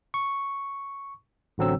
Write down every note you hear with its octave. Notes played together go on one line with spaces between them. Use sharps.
C#6
A1 D3 F#3 C4 E6